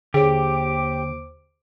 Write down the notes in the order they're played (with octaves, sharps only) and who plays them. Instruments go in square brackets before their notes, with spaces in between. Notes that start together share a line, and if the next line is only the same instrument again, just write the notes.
[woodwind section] D#2 C5 D6 [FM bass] D3 [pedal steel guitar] G4 [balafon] G#4 C#5